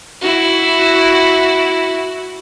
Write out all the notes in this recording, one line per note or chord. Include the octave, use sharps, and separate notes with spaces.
E4 F#4